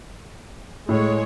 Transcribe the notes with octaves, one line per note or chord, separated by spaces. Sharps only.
A2 G#3 C#5